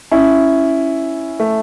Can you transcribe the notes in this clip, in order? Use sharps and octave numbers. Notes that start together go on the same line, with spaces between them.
C#4 E4
A3